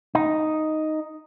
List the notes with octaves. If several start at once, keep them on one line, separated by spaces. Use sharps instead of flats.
D#4